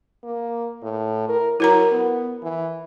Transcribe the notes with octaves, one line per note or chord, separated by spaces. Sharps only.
A#3
A2
A#4
F#3 E4 A#4 A#5
B3
E3